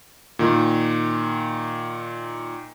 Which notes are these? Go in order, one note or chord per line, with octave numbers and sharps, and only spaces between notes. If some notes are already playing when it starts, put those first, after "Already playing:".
A#2 D#3